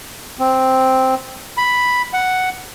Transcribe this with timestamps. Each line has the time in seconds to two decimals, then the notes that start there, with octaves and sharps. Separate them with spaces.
0.39 C4
1.57 B5
2.13 F#5